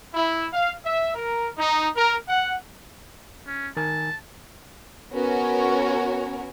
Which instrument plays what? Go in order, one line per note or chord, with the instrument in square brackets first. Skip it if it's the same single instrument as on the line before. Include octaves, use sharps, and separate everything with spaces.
[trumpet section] E4
F5
E5
A#4
D#4
A#4
F#5
[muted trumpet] C#4
[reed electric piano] D#3 A#4 G#5 [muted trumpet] A5
[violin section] B3 C#4 F#4 A#4 C#5